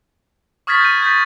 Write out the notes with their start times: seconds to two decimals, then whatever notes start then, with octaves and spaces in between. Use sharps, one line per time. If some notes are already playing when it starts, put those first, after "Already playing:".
0.67 C#6 D#6 F6 G#6 A6 B6
0.81 G6 D#7
1.02 G6 A6 B6